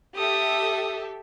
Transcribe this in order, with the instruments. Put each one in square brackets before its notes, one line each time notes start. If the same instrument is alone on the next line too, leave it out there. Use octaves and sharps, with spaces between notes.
[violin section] G4 A4 E5 [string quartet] D#6